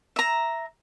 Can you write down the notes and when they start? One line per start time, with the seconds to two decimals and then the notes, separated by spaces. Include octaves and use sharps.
0.16 E5 A#5